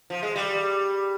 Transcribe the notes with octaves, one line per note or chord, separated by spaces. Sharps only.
F3
G#3
G3